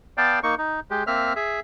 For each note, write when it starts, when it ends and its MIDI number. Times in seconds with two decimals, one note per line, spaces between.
0.18 0.39 59
0.18 0.39 74
0.18 0.39 77
0.18 0.39 79
0.18 0.39 81
0.43 0.55 58
0.43 0.55 63
0.43 0.55 85
0.58 0.80 63
0.91 1.04 56
0.91 1.04 67
1.07 1.33 58
1.07 1.33 60
1.07 1.33 76
1.07 1.33 89
1.36 1.60 68
1.36 1.60 76